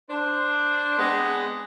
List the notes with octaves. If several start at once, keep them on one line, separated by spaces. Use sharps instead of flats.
D4 C5
G#3 B3 C4